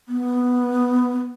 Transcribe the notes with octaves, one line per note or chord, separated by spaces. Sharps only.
B3